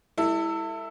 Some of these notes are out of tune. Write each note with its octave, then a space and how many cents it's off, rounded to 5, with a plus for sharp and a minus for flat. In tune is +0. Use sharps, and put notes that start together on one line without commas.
G#3 -35 E4 +0 A4 +40